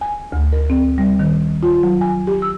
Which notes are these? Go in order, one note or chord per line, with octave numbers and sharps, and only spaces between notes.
G#5
D2
A#4
C4
G3
D#3
F4
F#3
G#5
G4
E6